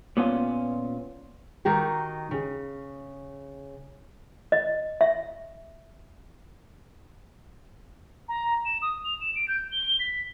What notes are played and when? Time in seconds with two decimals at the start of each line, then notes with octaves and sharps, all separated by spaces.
0.17 A#2 B3 C#4 F4
1.65 D#3 D#4 F#4 G4
2.31 C#3
4.52 D#5
5.01 E5
8.28 A#5
8.65 E7
8.82 D#6
9.04 F7
9.21 E7
9.35 D7
9.48 G6
9.72 G7
10.00 B6